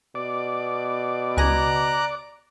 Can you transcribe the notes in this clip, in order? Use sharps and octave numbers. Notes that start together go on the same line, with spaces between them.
B2 D5
C#2 G#5 A#5 F#6 A#6